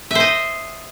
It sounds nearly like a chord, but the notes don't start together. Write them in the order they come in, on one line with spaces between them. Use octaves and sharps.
E5 C5 D#5